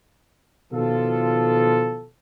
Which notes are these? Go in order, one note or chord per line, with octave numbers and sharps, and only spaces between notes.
B2 D#3 F3 F4 A4